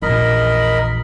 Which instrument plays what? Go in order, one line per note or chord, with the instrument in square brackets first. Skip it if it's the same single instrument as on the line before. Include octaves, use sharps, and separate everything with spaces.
[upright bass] A#1 E2 [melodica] A#4 D#5 B5